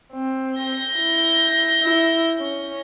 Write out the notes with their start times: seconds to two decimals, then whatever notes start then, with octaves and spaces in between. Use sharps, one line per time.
0.12 C4
0.56 G6 A#6
0.95 E4
1.82 E4
2.38 C#4